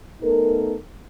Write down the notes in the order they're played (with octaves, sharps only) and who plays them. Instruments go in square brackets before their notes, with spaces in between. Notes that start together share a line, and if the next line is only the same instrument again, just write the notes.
[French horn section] A3 B3 D#4 A4 A#4